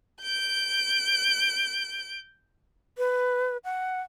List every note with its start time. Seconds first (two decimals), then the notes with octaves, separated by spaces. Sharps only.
0.21 G6 D7
2.98 B4
3.64 F#5